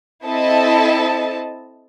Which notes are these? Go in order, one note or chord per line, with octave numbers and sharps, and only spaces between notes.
C4 E4 A4 D#5 A5